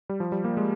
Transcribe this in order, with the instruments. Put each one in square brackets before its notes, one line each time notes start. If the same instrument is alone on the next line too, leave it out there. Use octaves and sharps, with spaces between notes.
[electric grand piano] G3
F3
G3
A#3
G#3